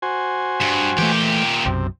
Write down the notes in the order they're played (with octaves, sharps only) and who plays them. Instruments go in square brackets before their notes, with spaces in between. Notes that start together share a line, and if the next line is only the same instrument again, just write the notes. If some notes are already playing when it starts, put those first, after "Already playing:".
[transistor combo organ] F#4 C5 G#5
[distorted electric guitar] G2
[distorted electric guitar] A#2 G4 [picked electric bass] E3 F#3 A3
[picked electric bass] B1 F#2 [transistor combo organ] C3